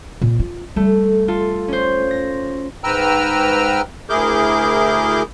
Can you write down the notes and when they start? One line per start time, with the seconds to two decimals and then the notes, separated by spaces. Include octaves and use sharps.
0.22 A#2
0.39 F4
0.76 G3 A3
1.28 F4 A4
1.68 C#4 C5
2.11 A#6
2.84 G#2 B4 G5 A#5 E6 F6
4.09 D2 E4 G#4 A#4 D6 G6